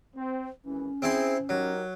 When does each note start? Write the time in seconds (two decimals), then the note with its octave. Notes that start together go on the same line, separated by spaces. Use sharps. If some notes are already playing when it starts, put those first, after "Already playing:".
0.15 C4
0.65 G#1 E3 C#4
1.02 C4 E4 G#4 C6
1.49 F#3 D#4 G4 A#4